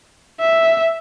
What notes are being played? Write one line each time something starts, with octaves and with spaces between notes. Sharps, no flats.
E5